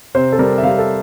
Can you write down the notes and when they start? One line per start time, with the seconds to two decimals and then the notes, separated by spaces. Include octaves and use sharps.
0.15 C3 C5
0.32 A4
0.39 G3 A#4
0.58 E5
0.63 G3 F5
0.79 A4